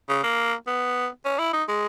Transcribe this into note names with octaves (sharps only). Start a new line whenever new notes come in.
C#3
A#3
B3
C#4
E4
D#4
G#3